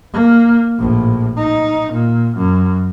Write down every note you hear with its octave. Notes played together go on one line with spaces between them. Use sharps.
A#3
A#1 A2
D#4
A#2
F#2